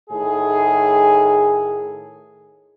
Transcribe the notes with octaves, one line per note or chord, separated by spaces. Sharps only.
A2 D#3 G#4